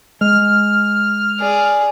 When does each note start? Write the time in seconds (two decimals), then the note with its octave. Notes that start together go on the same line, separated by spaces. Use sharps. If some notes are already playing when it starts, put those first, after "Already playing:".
0.21 G#3 F6
1.40 G#4 D5